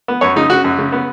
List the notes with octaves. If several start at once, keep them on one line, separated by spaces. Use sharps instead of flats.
B3
F#2 C#5
C#3 D#4
C#3 F#4
F#2
C#3
B3